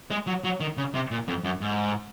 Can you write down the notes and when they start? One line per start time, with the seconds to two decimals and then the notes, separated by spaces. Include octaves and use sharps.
0.11 G#3
0.27 F#3
0.44 F#3
0.60 D#3
0.77 C#3
0.94 C3
1.11 A#2
1.28 F2
1.44 F#2
1.61 G#2